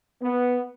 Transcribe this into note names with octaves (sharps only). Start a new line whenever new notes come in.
B3